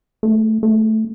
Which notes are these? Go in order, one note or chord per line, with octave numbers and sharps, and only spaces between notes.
A3
A3